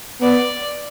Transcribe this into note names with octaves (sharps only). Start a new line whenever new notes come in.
B3 D5